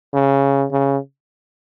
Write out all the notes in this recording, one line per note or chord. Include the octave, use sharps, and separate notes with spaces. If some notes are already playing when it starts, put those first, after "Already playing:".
C#3
C#3